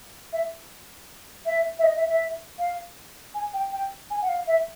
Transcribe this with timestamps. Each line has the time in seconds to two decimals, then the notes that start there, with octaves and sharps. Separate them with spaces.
0.33 E5
1.46 E5
1.79 E5
1.84 D#5
1.96 E5
2.09 E5
2.59 F5
3.34 G#5
3.53 G5
3.72 G5
4.10 G#5
4.22 F#5
4.29 F5
4.47 E5